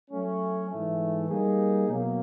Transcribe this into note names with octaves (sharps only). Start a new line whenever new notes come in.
F#3 A3 C#4
G#2 E3 A3
G3 A#3 D#4 G#4
B2 F#3 A#3